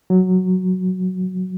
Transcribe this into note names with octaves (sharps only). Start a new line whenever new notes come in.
F#3